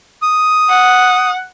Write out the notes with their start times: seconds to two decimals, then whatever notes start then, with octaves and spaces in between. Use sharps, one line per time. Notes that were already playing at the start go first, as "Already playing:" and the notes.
0.22 D#6
0.69 F#5